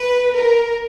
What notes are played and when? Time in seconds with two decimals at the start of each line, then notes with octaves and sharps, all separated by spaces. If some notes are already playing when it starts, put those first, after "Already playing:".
Already playing: B4
0.34 A#4